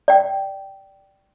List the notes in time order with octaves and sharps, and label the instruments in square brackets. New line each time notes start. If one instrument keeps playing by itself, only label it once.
[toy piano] D5 G5